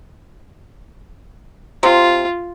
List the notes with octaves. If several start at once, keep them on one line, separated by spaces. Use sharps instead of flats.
C3 F4